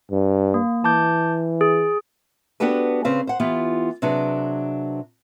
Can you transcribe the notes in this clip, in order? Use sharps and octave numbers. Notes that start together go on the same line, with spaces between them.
G2
A#3
E3 A5 D6 G6
G#4
B3 D4 F#4 G4 A4 B4
C#3 C4 B4 F5
C5 F#5
E3 B3 F4 G4
C3 F#3 D4 G#4 B4